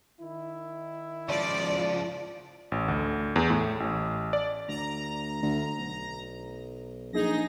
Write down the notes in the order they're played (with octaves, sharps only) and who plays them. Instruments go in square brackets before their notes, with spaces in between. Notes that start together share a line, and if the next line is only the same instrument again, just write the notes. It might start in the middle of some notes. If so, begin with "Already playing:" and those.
[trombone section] D#3 E4
[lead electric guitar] C#2 F3 [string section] D5
[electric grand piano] A1
D2
E2
A2
A1
D5
[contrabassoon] D2 [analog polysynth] A#5
[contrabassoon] D2
B1
[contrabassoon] A#1 [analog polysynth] D#4 G#4 A#6